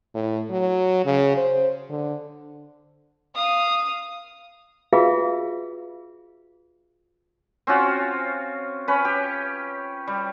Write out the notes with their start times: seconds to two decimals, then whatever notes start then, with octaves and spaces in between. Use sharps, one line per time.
0.14 A2
0.50 F#3
1.05 C#3
1.37 C5
1.89 D3
3.35 F5 D#6
4.93 F4 F#4 G#4 B4 E5 F5
7.67 C4 C#4 F4 F#4
8.88 C#4 B4
9.05 G4
10.07 G3